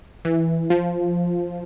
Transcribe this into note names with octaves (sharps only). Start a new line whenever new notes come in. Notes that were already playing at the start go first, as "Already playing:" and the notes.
E3
F3